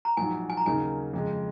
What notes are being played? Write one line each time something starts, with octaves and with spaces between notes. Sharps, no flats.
A#5
A#1 G#2 F#3 G#5
G#5
A#5
D#2 C#3 F#3 A#3 D#4 G#5
F2 C#3 G#3